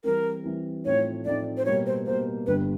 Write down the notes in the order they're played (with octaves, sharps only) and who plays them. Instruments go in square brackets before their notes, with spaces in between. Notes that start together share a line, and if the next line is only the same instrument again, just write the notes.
[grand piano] E3 G3 C4 [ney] A#4
[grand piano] E3 G3 C4
[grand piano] A2 F3 A3 C4 D#4 [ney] C#5
[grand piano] A2 F3 A3 C4 D#4 [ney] D5
[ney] C5
[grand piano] B2 G3 A#3 [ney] C#5
[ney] C5
[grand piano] B2 G3 A#3 [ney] C5
[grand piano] G1 G2 D3 G3 [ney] B4